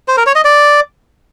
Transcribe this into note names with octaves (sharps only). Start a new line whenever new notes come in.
C5
A#4
C#5
D#5
D5